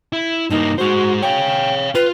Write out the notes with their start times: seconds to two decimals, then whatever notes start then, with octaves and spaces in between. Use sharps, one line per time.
0.13 E4
0.50 G2 A#3 D#4
0.78 G#3 F#4 C5
1.22 C#5 F5 G5
1.95 F4 B4